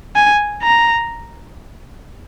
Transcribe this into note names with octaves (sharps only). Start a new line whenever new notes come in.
G#5
A#5